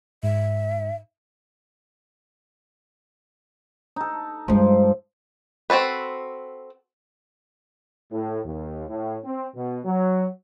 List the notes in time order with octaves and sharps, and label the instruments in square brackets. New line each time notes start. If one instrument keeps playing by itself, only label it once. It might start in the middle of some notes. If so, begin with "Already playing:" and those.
[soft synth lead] G#2 [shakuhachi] E5
[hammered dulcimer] D#4 A4
[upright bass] G2 G#3 [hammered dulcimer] F3
[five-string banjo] C4 F#4 A4 B4
[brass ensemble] A2
D#2
A2
C4
B2
F#3